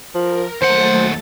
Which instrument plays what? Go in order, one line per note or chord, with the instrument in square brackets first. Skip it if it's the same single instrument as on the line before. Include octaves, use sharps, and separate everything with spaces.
[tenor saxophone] F3 [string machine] A#4
[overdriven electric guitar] D#2 F#5 [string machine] F#3 A3 A6 [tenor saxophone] C5